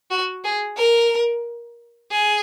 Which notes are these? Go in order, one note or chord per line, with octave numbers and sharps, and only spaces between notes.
F#4
G#4
A#4
G#4